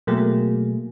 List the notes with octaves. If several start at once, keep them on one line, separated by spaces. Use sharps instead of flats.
B2 F#3 A3 A#3 G#4